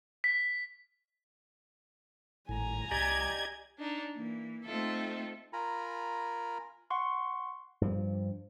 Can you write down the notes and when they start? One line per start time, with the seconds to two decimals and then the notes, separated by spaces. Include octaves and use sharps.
0.24 B6
2.49 G#1 A2 G#5 A#5
2.91 C2 G4 D5 D#5 G#6
3.79 D4 D#4
4.12 E3 A#3
4.64 A3 C4 D#4 F4 A4 E5
5.53 F4 A#4 G#5 A#5 B5
6.90 F#5 C6 C#6
7.81 G2 F3